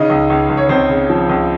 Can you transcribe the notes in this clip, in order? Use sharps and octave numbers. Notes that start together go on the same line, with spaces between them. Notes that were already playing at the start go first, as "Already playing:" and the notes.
Already playing: C#3 D#4 D#5
C#2
C#2
C#2
C#5
C#2 C4 C5
C#3
F3
C#2